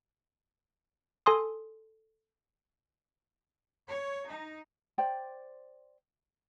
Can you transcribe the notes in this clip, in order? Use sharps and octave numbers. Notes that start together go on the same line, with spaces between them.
A4 G#5 C6 D#6
C#5
D#4
C5 D5 G5